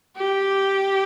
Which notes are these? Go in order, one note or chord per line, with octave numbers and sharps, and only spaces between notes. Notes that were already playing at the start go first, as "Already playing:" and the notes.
G4